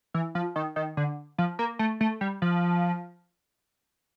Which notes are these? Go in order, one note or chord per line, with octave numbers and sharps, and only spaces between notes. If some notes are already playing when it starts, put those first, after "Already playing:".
E3
F3
D#3
D#3
D3
F3
A#3
A3
A3
G3
F3